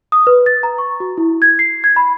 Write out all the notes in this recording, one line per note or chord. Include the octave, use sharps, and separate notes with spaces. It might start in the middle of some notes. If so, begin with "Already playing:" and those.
D#6
B4
A6
A#5
C#6
F#4
E4
G#6
C7
G#6
B5